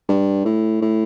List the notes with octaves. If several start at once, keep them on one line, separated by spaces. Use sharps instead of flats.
G2
A2
A2